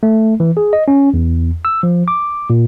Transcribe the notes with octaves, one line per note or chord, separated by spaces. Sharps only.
A3
E3
G#4
D#5
C#4
E2
E6
F3
D6
A#2